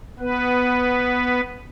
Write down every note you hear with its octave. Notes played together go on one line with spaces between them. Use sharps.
B3 B4